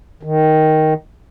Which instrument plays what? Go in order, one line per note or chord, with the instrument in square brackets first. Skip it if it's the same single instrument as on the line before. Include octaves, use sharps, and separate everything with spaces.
[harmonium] D#3